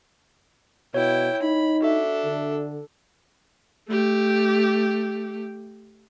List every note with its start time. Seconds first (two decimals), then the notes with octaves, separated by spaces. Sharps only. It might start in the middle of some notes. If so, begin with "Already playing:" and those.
0.94 B2 E4 C#5 G5
1.42 D#4 B5
1.82 D4 F#4 A4 E5
2.24 D3
3.89 A3 G4